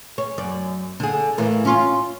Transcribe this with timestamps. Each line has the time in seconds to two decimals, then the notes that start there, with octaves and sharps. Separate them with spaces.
0.18 C#4
0.38 F#2 D5
1.00 D3 G#4
1.38 A2 E3 A#3
1.65 C#4 F4